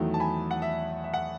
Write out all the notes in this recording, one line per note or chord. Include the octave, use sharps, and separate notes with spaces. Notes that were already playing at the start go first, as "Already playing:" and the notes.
Already playing: E2 D#3 F#3 A3
A5
G#5 B5
F#5
E5
E5
F#5